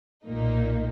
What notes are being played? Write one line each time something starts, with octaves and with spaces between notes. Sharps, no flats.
B1 A#2 A#3 D#4